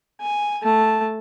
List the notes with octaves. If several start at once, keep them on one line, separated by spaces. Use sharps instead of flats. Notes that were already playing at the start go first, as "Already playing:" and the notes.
G#5
A3 A5